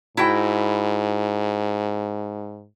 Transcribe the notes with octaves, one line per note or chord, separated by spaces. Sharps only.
G#2 E4 F#4 G5